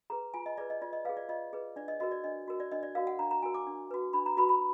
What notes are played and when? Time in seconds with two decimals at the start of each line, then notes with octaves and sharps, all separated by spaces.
0.10 G#4 B4 A#5
0.34 F4 G#5
0.46 D#5
0.58 G#4 B4 D5
0.70 D#5
0.82 F4 D5
0.93 D#5
1.05 B4 F5
1.09 G#4
1.17 D5
1.29 F4 D#5
1.53 G#4 B4
1.76 D4 D5
1.88 D#5
2.00 F#4 A#4 D#5
2.12 D5
2.24 D4 D#5
2.48 F#4 A#4
2.60 D5
2.72 D4 D#5
2.83 D5
2.95 F#4 A#4 F5
3.07 F#5
3.19 D4 A#5
3.31 A#5
3.42 F#4 A#4 G#5
3.54 D6
3.67 D4
3.91 F#4 B4
4.13 D4 B5
4.26 A#5
4.37 F#4 B4 B5
4.49 B5